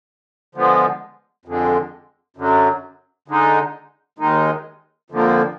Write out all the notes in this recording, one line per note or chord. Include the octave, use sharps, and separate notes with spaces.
D3 F3 G#3 B3
F2 D3 G#3
F#2 D3 F#3
D3 G#3 D#4
D#2 D#3 G#3 D#4
F2 D3 F3 A#3